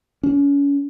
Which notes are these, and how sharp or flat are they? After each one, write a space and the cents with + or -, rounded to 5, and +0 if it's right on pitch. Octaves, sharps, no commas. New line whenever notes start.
C#4 +35